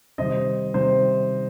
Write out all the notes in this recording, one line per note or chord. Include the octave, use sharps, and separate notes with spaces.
C3 D#3 G3 C5 D#5
C3 D#3 G3 C5